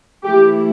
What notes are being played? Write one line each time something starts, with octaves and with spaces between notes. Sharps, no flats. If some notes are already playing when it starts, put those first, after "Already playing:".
E3 A3 E4 G4